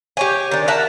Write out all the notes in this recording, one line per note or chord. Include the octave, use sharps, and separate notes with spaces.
G4 C#5 G#5
D#3 D4
A#4 E5 F#5 A5